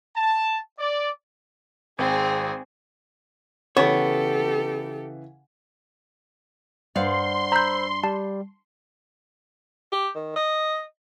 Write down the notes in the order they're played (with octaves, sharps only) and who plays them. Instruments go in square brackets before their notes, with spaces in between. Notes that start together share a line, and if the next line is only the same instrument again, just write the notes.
[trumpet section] A5
D5
[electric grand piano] G#1 [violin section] C4 G#4
[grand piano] C#3 E3 [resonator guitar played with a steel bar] B3 [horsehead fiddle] G4 A4 [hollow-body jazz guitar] C#5
[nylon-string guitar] G2 D5 F5 [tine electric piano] C5 F#5 [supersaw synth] C6
[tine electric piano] C5 B5 E6 [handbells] A#5 G6
[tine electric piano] G3 [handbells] A5
[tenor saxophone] G4
D#3
D#5